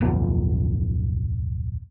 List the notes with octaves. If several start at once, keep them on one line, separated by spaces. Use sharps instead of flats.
D1 B1 F2 B3